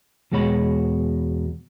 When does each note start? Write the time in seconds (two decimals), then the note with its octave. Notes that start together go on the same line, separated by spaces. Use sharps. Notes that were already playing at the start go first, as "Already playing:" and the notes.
0.32 E2 B2 G#3 F#4 C#5 B5